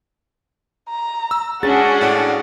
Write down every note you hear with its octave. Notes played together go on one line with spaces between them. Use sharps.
A#5
E6
C#4 D4 F#4 G#4 F#5 A6
A2 D5